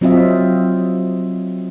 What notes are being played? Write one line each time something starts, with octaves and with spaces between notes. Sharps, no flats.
F#3 C4 F4 D#5 E5